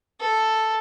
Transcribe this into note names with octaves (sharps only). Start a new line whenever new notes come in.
A4